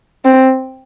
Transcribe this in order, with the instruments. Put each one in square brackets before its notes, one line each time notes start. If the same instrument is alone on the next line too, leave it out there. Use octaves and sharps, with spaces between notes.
[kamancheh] C4